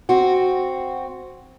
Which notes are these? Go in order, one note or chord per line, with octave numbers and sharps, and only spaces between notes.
C4 F#4